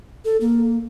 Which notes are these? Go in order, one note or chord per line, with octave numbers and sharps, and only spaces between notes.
A4
A#3